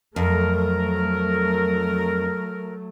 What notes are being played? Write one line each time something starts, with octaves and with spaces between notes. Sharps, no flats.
F2 F#3 A3 A#4